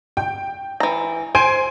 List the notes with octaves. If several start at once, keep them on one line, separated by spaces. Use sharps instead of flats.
G5
E3 A#5
C5 G#5 D7